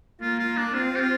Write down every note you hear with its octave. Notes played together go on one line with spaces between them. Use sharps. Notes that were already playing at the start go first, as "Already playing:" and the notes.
A#3 F4
F4
D4
C4 F4
G4
F4